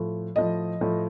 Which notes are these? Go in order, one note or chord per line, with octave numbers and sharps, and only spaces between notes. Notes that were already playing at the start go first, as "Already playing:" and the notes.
Already playing: A2 F3
A2 F3 D#5
A2 F3